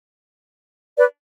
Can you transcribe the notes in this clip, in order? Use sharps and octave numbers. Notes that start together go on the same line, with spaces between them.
B4 D5